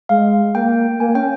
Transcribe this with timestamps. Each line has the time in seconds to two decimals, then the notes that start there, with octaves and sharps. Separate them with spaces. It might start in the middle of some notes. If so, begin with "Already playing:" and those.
0.09 G#3 F5
0.55 A#3 G5
1.00 A#3 G#5
1.15 C#4 G5